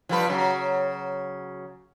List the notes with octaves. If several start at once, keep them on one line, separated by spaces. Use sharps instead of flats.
F3 G3 B4
C#3 F#3